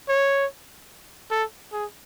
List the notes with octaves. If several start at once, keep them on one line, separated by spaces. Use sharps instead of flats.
C#5
A4
G#4